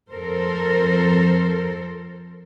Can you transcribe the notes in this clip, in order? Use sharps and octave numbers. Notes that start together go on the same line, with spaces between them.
F2 A4 A#4 C5